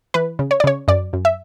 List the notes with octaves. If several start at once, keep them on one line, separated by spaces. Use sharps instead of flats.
E3 B4
C#3
C#5
D5
C#3 C#5
F#2 D5
F#2
E5